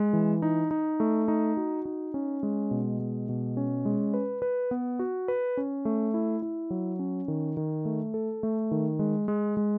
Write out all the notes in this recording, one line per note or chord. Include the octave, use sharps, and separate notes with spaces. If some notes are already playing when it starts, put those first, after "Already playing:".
Already playing: G#3
E3
D#4
D#4
A3
D#4
F#4
D#4
C#4
G#3
B2
G#3
B2
C#4
G#3
B4
B4
B3
F#4
B4
C#4
A3
E4
E4
F#3
C#4
D#3
D#3
A3
A4
A3
D#3
G#3
G#3
G#3